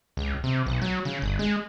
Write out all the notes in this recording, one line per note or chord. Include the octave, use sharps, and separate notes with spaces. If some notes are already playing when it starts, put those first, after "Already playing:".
C#2
C3
B1
F#3
C#3
G1
G#3